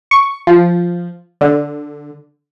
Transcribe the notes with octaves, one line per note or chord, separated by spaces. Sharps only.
C#6
F3
D3